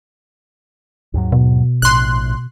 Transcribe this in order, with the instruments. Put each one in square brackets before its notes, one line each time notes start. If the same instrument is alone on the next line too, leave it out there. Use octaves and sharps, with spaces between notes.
[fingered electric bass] D#2 G#2 F#3
[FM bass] B2
[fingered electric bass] A#1 A2 [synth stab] C6 F#6